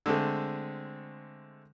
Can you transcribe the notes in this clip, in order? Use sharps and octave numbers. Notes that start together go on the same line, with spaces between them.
D3 G#3 A3 C4